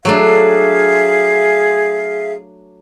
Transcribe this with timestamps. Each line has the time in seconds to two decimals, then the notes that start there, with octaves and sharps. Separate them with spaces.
0.05 F#3 A3 D4 G#4 E5 F5